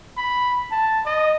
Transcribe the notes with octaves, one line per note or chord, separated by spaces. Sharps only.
B5
A5
D#5